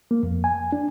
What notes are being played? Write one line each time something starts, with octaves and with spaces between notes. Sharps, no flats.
A#3
F2
G#5
D4